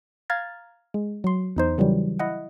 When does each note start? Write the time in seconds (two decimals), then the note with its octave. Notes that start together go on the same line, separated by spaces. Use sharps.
0.30 F5 A#5 F6 G#6 A6
0.94 G#3
1.24 F#3 C6
1.56 E2 D#4 C5
1.78 C#3 E3 F#3 G3
2.19 E4 D#5 F#5